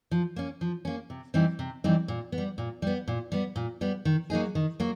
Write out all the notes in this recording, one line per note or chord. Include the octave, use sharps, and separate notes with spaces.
F3
A#3 C#4
F3
A#3 C#4
C3
E3 G3 C4 D#4
C3
E3 G3 C4 D#4
A#2
B3
G3
A#2
G3 B3
A#2
G3 B3
A#2
G3 B3
D#3
F#3 A#3 D#4 G#4
D#3
F#3 A#3